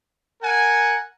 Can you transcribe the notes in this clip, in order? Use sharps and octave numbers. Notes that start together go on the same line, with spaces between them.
A#4 F#5 G#5